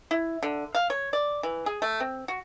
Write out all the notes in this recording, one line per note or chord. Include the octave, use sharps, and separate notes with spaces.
E4
D3
F5
C#5
D5
E3
G#4
A3
C4
F#4